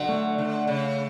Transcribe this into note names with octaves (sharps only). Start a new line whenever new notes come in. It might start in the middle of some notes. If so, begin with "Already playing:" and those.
Already playing: D3 F#3
A3
D3
C#3